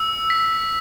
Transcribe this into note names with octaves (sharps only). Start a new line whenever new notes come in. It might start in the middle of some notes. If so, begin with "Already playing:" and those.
Already playing: E6
B6